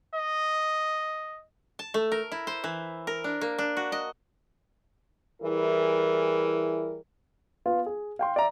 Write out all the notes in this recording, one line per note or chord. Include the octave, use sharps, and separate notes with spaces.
D#5
A5
A3
A#4
E4
C5
E3
A#4
D4
A#3
D4
F#4
D#5
E3 G3 E4 G#4 A#4
B3 F4 F5
G#4
F5 G5 C6
D5 E5 A#5